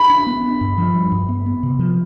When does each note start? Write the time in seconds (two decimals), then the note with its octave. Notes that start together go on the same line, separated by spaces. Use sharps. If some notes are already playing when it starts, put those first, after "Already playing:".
Already playing: B5
0.10 D4
0.27 B3
0.43 D4
0.61 G2
0.78 F3
0.94 G2
1.12 G2
1.29 B3
1.46 B3
1.63 C3
1.79 F3